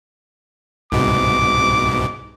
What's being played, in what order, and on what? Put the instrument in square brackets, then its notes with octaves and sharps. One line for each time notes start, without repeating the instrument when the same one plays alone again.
[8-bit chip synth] C2 G#2 B2 [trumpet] D6